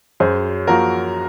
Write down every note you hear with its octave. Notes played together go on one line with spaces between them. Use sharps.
F#2 G#4 C5
F3 A#3 F#4 A#4